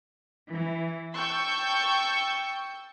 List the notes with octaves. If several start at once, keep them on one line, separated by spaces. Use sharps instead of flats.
E3
G5 A5 C#6 E6 G6